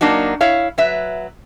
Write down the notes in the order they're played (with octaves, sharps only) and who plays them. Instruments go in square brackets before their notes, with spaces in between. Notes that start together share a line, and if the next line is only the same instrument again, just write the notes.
[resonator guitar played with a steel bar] F#3 A#3 D4 D#4 F#4
E4 C#5 F5
F#3 B4 E5